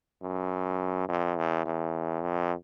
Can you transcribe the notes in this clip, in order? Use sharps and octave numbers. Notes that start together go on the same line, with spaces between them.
F#2
F2
E2
E2
F2